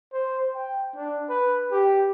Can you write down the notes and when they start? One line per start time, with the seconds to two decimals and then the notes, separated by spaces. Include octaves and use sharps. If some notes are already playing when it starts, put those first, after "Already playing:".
0.13 C5
0.55 G5
0.96 D4
1.29 B4
1.72 G4